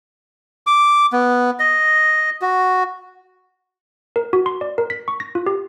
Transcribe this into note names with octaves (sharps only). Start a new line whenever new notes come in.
D6
B3
D#5
F#4
A#4
F#4
C6
D5
A#4
B6
C#6
A#6
F4
G4